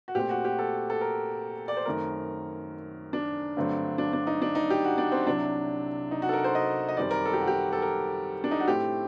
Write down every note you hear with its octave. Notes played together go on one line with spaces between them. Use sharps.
F#4
A#2 A3 C4 G4
F#4
G4
A4
A4
A#4
D5
C5
F#2 D#3 A3 C4 A#4
D4
G2 D3 F#3 A3 C4
D4
D4
D#4
D4
D#4
G4
F#4
D4
C4
C2 C3 F#3 D4
D#4
F#4
A4
A#4
C5
D#5
D#5
F#2 D#3 G3 C4 D5
A#4
A4
G4
F#4
G4
A4
A#4
D4
D#4
F#4
A2 A3 C4 G4